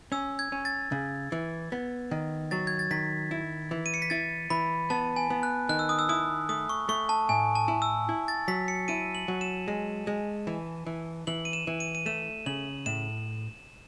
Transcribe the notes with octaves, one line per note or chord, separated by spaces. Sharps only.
C#4 E6
G#6
C#4
A6
C#3
E3
B3
D#3
F#3 A6
G#6
A6
D#3 B6
E4
E3
D#7
C#7
B6
E4 A6
E3 B5
B3 A5
G#5
B3
F#6
D#3 F#6
E6
D#6
E6
E4 D#6
A3 D#6
C#6
A3 C#6
A5
A2 G#5
A5
E4
E6
E4
A6
F#3 B6
C#7
E4 D#7
F#7
F#3
E7
G#3
G#3
E3
E3
E3 F#7
D#7
E7
E3
D#7
D#7
A3 E7
C#3 F#7
A2 E7